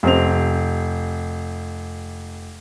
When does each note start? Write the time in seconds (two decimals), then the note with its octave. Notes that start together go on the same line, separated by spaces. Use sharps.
0.03 F1 C4 F7